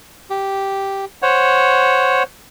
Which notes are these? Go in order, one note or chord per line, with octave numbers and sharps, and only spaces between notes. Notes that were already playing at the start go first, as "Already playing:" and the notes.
G4
C5 C#5 F#5